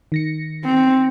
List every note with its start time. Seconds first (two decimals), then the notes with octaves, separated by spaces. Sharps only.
0.12 D#3 A#6 C#7
0.65 C4